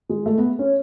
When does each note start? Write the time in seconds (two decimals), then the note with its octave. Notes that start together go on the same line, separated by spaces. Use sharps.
0.09 G#3
0.26 A3
0.38 B3
0.59 C#4